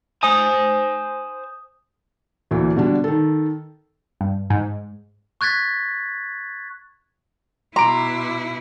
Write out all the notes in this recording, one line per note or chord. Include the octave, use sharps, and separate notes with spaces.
C5 G#5 D#6
D2 A#2 E3
B2 D3 G3 D4
D#3 A4
G2
G#2
C#6 F#6 G#6 A6 B6
B2 E4 A#5 C6 D6 D7